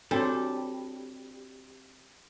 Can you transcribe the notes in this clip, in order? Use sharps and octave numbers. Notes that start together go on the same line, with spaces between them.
G3 C4 D4 F#4 A4 C#5